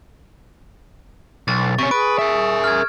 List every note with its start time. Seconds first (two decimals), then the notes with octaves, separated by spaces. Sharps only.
1.48 B1 A6
1.79 C3 A#3 C#4 C#6
1.91 G#4 B4 D7
2.19 A#4 E5
2.64 F6 G#6